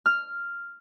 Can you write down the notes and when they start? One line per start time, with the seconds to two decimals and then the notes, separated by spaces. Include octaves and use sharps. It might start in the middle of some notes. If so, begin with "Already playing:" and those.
0.06 F6